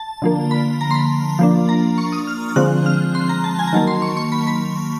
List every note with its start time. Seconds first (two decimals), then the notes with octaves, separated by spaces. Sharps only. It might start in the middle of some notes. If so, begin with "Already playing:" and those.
Already playing: A5
0.22 D3 F3 A#3
0.51 B5
0.81 A#5
0.91 C6
0.95 B5
1.39 F3 A#3 D4
1.69 A#5
1.98 C#6
2.12 D#6
2.27 F6
2.56 D3 F3 G#3 C4 F#6
2.86 F6
3.15 C6
3.29 A#5
3.44 A5
3.59 G#5
3.67 A#5
3.73 D#3 F#3 A#3 A5
3.87 C6
4.02 C#6
4.17 C#6
4.32 B5
4.47 B5